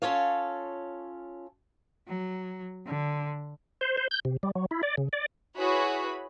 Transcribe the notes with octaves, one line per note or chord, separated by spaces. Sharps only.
C#4 D#4 F4 A4 C#5 F5
F#3
D3
C5
C5
G6
C3
G3
F#3
E4
D5
C#3
D5
E4 F#4 G#4 B4 C#5 B5